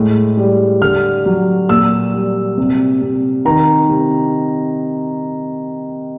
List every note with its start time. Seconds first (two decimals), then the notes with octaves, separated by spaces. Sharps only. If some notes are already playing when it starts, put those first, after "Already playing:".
Already playing: A2 G#3
0.37 G3
0.82 D3 F6
1.26 F#3
1.69 A#2 E6
2.14 G3
2.58 C3
3.02 C3
3.45 D#3 A#5
3.89 C3